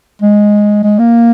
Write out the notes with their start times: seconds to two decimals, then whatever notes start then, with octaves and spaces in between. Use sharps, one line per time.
0.22 G#3
0.84 G#3
0.99 A#3